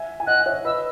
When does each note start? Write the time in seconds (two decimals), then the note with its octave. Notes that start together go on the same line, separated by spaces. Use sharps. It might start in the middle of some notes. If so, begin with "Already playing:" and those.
Already playing: E5 G#5
0.20 G#5
0.27 D#5 F#5 F#6
0.46 C#5 E5
0.65 B4 D#5 E6